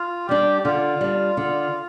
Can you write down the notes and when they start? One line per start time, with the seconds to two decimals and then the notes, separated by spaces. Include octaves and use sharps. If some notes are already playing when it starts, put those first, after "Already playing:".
Already playing: F4
0.28 G3 D4 G4
0.59 G4
0.65 D3 F4
1.01 G3 D4
1.37 D3